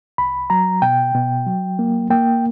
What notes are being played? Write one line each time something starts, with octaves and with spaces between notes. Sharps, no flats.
C2 B5
F#3 A#5
B2 G5
B2
F#3
A#3
A#3 G5